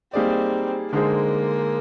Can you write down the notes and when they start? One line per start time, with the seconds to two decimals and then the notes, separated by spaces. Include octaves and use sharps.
0.13 G3 A#3 C4 D#4 G#4 D5
0.93 D3 G#3 A#3 D#4 G#4 C5